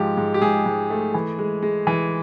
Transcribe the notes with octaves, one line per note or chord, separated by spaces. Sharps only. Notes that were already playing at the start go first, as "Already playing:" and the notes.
Already playing: G#2 F3 G4
G#2
G4
G#2 G#4
G#2
A3
E3
G#3
G#3
E3